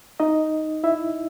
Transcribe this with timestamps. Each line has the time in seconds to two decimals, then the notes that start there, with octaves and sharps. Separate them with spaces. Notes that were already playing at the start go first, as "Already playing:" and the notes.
0.20 D#4 D#5
0.84 E4 E5